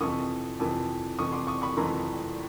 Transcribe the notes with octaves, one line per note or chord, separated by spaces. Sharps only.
F2 C3 E3 C#6 D#6
F2 C3 E3
F2 C3 E3 C#6 D#6
C6 D6
C#6 D#6
B5 C#6
F2 C3 E3 A#5 C6